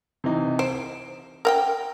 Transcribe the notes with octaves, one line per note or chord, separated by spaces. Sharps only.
C3 E3 D#4
C5 D7
A#4 F#5 G5